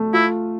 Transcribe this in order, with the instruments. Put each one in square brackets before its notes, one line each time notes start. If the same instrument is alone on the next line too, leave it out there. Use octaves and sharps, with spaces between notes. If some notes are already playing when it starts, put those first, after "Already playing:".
Already playing: [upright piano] A3
[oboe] E4 [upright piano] F4